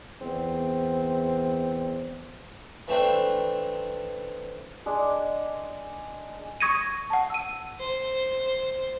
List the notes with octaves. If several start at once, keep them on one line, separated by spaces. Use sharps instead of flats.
E2 C4
E3 A3 C4 D4
G#3 D4 G#4
C#6 D#6 G#6 A#6 C#7 D#7
F#5 A5
E6 D#7
C5